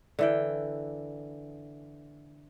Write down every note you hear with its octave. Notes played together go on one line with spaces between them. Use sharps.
D3 E3 G5